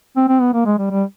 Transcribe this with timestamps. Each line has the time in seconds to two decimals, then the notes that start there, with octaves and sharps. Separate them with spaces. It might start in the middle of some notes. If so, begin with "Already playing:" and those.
0.16 C4
0.28 C4
0.41 B3
0.53 A#3
0.66 G#3
0.78 G3
0.91 G3